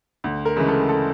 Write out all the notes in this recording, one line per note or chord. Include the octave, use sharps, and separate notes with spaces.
D2
A#4
C#3 E3 G#3
A4
A4